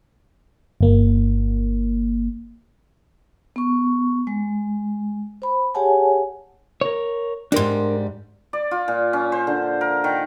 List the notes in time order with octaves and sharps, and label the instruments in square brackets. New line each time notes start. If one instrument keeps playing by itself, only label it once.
[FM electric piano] G1 A#3
[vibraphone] B3 C#6
G#3
C5 B5
G4 G#4 C#5 F#5 G#5 A5
[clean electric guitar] A#4 C#5
[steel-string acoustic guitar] G#2 G3 [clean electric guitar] D4 A#4 C6
[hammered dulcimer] D5
F4
A#2
C#4
C5
D3
A#4
D#3